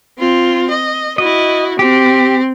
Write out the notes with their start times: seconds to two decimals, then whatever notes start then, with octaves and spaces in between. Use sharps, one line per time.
0.19 C4 F4
0.70 D#5
1.18 E4 F#4 D#5
1.79 C4 G4